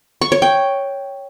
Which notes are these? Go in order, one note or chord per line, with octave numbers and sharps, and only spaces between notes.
C#6
C#5
G5